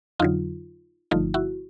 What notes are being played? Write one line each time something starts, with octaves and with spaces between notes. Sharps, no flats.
F2 D3 F#3 D#4 F4
G1 G2 D3 F3 A3 D#4 F4
E4 F#4